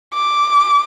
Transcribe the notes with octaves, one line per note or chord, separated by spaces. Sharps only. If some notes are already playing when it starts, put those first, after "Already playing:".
D6